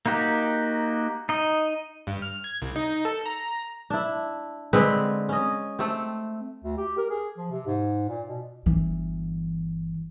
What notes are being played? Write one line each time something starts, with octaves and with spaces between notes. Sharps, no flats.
A#3 D#4 F#4 G4
D#4 D#5
G2
F6
G#6
C2
D#4
A4
A#5
D4 E4
D3 G#3 C4 B4
C#4 D#5
A3 C4
D2
G4
A#4
G#4
F3
C3
G#2
A#2
B2
G1 E3